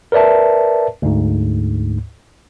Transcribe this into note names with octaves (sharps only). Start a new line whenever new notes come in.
A#4 B4 D5 E5 A5
D2 G#2